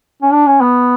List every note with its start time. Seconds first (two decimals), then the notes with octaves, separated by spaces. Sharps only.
0.23 C#4
0.33 D4
0.47 C#4
0.61 B3